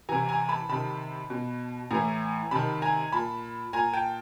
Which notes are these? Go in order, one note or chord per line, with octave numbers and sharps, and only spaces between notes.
C3 E3 G#5 A#5
G#5 A#5
A5 B5
C3 D#3 A5 B5
B2
A2 E3 G#5 A#5
C3 D#3 A5 B5
G#5 A#5
A#2 A5 B5
A#2 G#5 A#5
G5 A5